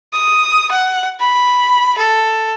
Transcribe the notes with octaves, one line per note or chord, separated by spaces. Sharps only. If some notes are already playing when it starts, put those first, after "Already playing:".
D#6
F#5
B5
A4